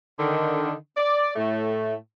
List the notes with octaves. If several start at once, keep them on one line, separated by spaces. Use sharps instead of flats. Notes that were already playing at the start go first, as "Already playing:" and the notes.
D3 D#3
D5
A2 A3